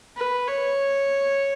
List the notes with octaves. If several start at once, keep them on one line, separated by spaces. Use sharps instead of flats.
B4
C#5